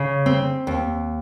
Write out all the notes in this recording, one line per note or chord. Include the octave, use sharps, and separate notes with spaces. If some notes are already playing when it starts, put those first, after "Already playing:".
Already playing: C#3
C4
D#2